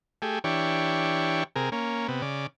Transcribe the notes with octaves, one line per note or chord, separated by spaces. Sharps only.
A3 G4 G#4
E3 D4 G4 C#5
C3 G#4 A#4
A#3 C#4
C3 B3
C#3 D5